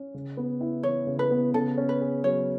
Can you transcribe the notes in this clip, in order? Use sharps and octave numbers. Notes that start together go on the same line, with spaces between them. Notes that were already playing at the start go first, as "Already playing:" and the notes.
Already playing: C#4
C#3
B3
E4
E3 C#5
C#3
B4
B3
C#3 A4
C#4
B4
G#4
F#3 C#5